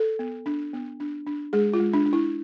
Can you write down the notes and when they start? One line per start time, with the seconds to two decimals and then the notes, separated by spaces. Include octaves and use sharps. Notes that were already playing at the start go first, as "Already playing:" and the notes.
Already playing: A4
0.19 B3
0.46 D4
0.73 B3
1.00 D4
1.26 D4
1.53 G#3 G#4
1.74 F4
1.80 G#3
1.94 D4
2.06 D4
2.13 E4